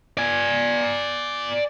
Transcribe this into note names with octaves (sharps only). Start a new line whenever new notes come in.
D5 G#5